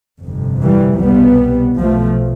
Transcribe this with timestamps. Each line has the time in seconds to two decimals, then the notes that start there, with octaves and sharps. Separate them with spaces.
0.23 G1 F2 C3
0.61 E3 G3
1.00 C2 B2 G3 B3
1.78 B1 B2 F3 A3